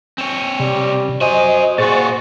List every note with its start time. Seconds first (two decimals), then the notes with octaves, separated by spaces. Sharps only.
0.18 C4 C#5
0.60 C3 G3
1.21 F#4 C5 D#5 G#5
1.78 A#2 F#4 G#4 C5 C#6 A6